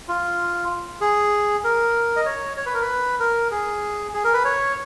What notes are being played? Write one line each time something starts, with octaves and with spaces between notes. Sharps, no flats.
F4
G#4
A#4
D#5
C#5
C#5
B4
A#4
B4
A#4
G#4
G#4
A#4
B4
C#5